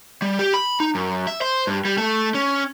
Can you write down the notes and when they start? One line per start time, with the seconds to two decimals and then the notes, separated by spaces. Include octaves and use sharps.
0.22 G3
0.39 G4
0.54 B5
0.80 D#4
0.95 F#2
1.27 E5
1.42 C5
1.67 G2
1.85 G3
1.98 A3
2.34 C#4